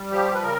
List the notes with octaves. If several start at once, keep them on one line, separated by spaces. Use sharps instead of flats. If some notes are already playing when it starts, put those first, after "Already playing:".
Already playing: G3
F3 G4
B4
C#3 A#4